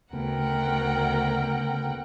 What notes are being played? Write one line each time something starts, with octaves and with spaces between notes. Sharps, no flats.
D2 C#3 A3 B3 A#4 F#5 G5